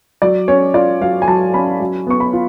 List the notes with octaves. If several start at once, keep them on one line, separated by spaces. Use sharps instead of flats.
F#3 D5
C#4 C#5
F4 D5
F#3 F5
G#5
F#3 A5
C#4 B5
F#3
B3 C#6
B5
F4